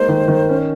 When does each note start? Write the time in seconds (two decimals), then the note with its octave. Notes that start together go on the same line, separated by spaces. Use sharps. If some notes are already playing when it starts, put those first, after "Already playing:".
Already playing: G#3 A#3 D#4 C5
0.09 D#3
0.28 D#3
0.49 C#4